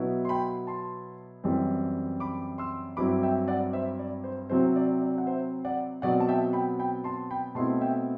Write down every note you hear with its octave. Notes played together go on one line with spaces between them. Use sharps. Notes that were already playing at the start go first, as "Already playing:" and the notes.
Already playing: B2 F#3 B3 E4
C6
G5 B5
A5 C6
F#2 E3 G3 C4
B5 D6
C6 E6
G2 F#3 C4 E4 B5 D6
E5 G5
D5 F#5
C5 E5
D5
C5
C3 F#3 C4 E4 C5
D5
D5
F#5
C5 E5
D5 F#5
B2 F#3 C4 D5 F#5
A5
E5 G5
G5 B5
G5 B5
A5 C6
G5 B5
B2 A3 C4 E4 A5 C6
E5 G5